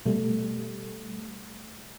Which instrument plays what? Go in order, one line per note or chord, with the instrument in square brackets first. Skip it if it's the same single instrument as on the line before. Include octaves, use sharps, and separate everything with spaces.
[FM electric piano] B2 G3 A3